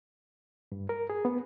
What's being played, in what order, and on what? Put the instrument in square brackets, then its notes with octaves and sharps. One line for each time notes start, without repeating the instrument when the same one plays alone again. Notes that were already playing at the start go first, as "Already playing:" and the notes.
[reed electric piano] G2
A#4
G#4
B3